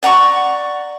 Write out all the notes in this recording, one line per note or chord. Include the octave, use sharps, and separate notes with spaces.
D5 F#5 A#5 C#6